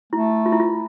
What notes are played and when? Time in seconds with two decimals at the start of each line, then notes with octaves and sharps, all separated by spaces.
0.13 A3 E4
0.46 F4
0.52 E4
0.60 F4